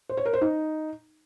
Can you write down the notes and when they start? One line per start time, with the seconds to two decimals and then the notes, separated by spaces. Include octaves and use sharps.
0.09 C5
0.17 C#5
0.25 A#4
0.33 C5
0.41 D#4